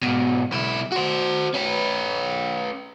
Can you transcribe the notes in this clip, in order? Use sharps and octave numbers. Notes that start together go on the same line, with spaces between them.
G#2 B2
B1 E4
F#4 C5
C#4 B4